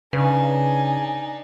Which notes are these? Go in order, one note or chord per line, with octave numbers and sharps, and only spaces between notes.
C#3 D4 D#4 B4 G#5